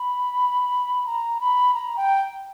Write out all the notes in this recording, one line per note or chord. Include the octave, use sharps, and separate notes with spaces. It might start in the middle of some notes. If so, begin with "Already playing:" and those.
Already playing: B5
A#5
B5
A#5
G5